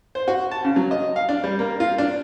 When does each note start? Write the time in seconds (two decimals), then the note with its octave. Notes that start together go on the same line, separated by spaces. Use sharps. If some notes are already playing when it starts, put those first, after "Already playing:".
0.15 C5
0.28 F#4
0.51 A5
0.65 C#3
0.76 F#3
0.91 D#5
1.16 F5
1.29 D4
1.44 G3
1.59 A#3
1.80 F4
1.98 D4